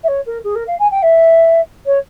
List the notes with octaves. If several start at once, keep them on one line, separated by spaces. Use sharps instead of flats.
E5
C#5
A#4
G#4
A#4
F5
G#5
G5
E5
C#5